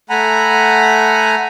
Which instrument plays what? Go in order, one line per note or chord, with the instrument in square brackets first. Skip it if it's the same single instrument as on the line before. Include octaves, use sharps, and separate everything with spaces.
[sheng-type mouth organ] A3 F#5 G#5 A#5 B5